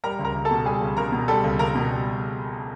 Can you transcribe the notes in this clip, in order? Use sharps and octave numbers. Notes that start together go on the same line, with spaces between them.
G3 A#4 A#5
C#2
A#4 A#5
C#2
A4 A5
B2
G3 G#4 G#5
C#2
C#2 A#4 A#5
B2
G3 A4 A5
C#2
C#2 A#4 A#5
B2
G3